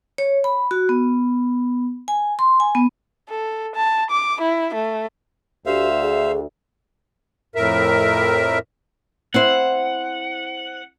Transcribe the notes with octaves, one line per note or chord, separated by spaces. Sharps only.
C#5
B5
F#4
B3
G#5
C6
G#5
B3
A4
A5
D6
E4
A3
D2 G4 C5 E5 F5
G#4
F2 A2 A#4 E5
C4 E4 C5 F#5